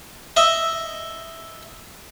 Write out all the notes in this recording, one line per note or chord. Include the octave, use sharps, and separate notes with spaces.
D#5 E5